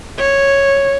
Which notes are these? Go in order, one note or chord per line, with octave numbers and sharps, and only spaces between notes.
C#5